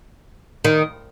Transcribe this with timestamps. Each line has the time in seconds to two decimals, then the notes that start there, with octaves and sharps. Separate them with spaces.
0.65 D#3